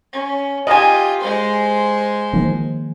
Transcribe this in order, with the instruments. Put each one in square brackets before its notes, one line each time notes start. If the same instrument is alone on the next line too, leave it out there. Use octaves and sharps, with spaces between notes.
[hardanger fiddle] C#4
[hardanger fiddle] F4 G4 [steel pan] D#5 G#5
[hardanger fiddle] G#3 C5
[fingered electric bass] D#3 F3 A#3